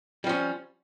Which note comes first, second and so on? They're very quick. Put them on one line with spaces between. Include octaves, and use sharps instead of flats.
G3 F3 C#4